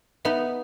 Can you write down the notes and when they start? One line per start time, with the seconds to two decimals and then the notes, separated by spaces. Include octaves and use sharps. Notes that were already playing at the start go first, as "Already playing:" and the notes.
0.25 B3 D#4 E5